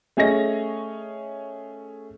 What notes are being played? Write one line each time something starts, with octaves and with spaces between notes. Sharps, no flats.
A3 C#4 G#4 C#5 D#5 A#6